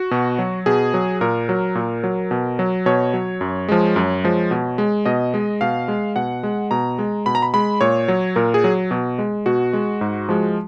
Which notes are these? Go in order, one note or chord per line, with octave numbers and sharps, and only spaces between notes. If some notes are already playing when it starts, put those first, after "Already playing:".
Already playing: F#4
B2
F#3
B2 G#4
F#3
A#2 A#4
F#3
A#2
F#3
B2
F#3
B2 C#5
F#3
F#2
F3 G#3
F#2
F3 G#3
B2
G#3
B2 D#5
G#3
B2 F5
G#3
B2 F#5
G#3
B2 A#5
G#3
B2 B5
A#5
B5
G#3 B5
A#2 C#5
F#3
A#2 A#4
G#4
F#3
B2
G#3
B2 F#4
G#3
G#2
F3 G#3